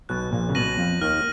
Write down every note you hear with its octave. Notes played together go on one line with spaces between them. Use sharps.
B1 B2 F#6
A#1 A#2
C#3
B1 B2 A#6 D#7 F#7
F2 F3
D#2 D#3 F6